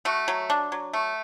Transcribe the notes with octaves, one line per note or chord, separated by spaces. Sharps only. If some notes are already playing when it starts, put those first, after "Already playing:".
A3 F#4
F#3
D4
F#3
A3